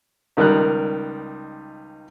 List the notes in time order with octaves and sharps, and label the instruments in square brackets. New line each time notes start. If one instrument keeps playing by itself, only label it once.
[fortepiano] C#2 D#3 G3 A#4 F#6